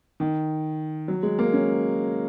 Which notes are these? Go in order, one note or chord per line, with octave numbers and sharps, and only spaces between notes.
D#3
F#3
G#3
A#3
C#4